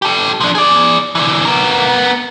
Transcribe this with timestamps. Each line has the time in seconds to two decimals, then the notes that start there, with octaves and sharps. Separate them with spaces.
0.02 G4 A4
0.40 F3 D4
0.55 G#4 D5
1.15 D3 E3
1.45 B3 A#4